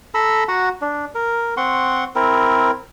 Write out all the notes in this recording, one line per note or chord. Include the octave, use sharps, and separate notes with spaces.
A4 A#5 B5 E6
F#4 F#5 A#5
D4
A#4
C4 F#5 C6 C#6
C4 E4 A#4